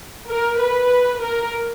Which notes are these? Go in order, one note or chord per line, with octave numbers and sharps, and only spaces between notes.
A#4
B4
A#4